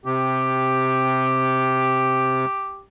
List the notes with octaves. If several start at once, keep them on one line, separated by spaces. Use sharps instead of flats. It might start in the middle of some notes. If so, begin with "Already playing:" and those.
C3 G4